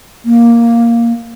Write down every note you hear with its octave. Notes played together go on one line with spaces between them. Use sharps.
A#3